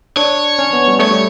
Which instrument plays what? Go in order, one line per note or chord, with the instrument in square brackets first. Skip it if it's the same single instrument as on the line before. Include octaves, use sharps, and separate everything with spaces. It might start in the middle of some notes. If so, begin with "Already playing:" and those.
[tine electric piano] D4 [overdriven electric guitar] C#5
[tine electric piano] C#4
B3
G3
[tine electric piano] A3 [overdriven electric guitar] C#5
[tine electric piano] G3